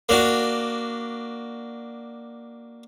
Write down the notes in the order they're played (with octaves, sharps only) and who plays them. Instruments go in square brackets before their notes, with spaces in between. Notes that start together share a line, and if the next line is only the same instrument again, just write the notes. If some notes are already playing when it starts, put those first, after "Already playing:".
[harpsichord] A#3 D4 F#4